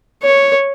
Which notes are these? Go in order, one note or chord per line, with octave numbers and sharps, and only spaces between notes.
C#5